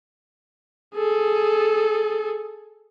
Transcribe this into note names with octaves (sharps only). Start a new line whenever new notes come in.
G#4 A4